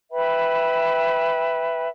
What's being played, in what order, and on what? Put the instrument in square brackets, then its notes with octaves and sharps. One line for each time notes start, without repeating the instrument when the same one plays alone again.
[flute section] B4 E5 G5 B5